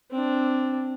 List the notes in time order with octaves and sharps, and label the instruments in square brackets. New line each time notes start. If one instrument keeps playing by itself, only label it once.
[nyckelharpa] C4 D4